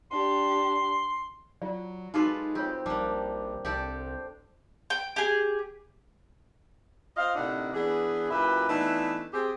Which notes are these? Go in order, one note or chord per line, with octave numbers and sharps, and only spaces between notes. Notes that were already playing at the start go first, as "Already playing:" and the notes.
D4 G4 C6
F#3 F4 D5
G#3 D#4 F4 F#4 A4 B4 D6
C4 F4 G4 C#5
A#1 G3 A#3 D4
C2 D4 G4 A4 C5 D5
G5
G4 G#4
F4 C5 D#5 F5
A2 C3 D4 D#4 A#4 F#5
E3 B3 D4 G#4
F#2 A#2 E4 G4 B4
E3 A3 B3 D4 D#4
C4 G4 G#4